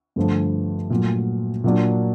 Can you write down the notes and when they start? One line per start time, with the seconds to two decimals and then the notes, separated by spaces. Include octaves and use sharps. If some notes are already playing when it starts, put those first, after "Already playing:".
0.16 G2 D3 F3 A3
0.90 A#2 F#3 A3
1.64 A#2 F#3 A#3 D4